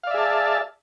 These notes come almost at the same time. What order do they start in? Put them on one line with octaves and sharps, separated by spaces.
F5 D5 E5 G#4 A5